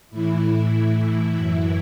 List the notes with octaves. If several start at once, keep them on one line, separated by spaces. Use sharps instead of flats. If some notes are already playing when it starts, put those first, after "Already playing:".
A2 E3 E4
F#2 E3